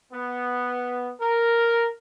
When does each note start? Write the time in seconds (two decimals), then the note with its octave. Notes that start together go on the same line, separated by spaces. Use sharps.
0.12 B3
1.21 A#4